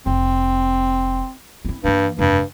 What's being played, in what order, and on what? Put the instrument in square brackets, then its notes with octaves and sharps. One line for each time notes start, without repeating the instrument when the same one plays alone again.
[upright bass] F1 [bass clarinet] C4
[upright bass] C4 E4
[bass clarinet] G2 [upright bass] E3 A#3
[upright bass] F1 [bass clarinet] G2